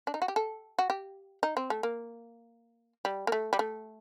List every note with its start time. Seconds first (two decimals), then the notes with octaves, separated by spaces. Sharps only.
0.07 D4
0.14 D#4
0.22 F#4
0.28 G4
0.36 A4
0.79 F#4
0.90 G4
1.43 D#4
1.57 C4
1.70 A3
1.83 A#3
3.05 G3
3.27 A#3
3.32 A3
3.53 G3
3.59 A3